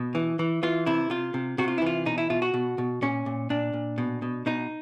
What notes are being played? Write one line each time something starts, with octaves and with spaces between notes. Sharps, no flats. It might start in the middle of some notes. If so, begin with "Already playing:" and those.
Already playing: B2
E3
E3
E3 F4
C3 E4
C3 F4
C3
C3 F#4
F4
E4
E3 F4
B2 D#4
E4
B2 F4
F#4
B2
B2
A#2 C#4
A#2
A#2 D4
A#2
B2
B2
B2 D#4